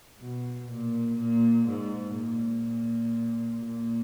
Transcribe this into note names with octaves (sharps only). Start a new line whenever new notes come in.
B2
A#2
A#2
G#2
A#2
A#2